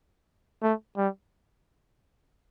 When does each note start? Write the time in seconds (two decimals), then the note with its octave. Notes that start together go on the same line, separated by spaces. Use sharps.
0.63 A3
0.97 G3